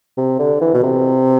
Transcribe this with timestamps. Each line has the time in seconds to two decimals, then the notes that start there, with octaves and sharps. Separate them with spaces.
0.17 C3
0.39 D3
0.61 E3
0.74 B2
0.83 C3